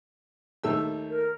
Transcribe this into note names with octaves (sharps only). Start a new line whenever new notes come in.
D#2 A3 E6
A#4